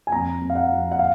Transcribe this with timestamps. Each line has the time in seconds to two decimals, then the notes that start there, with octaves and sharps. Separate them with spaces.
0.07 G#5
0.12 F2 A#5
0.41 F2
0.50 F5
0.55 F#5
0.71 F2
0.92 F#5
0.99 F5